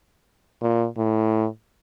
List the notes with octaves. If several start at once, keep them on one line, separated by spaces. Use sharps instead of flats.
A#2
A2